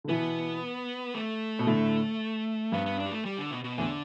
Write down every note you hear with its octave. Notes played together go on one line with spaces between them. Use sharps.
D3
B2 E3 B3
A3
B2
A2 D3
G2 B3
B3
D4
G3
A3
G3
D3
B2
B2
E2 A2 D3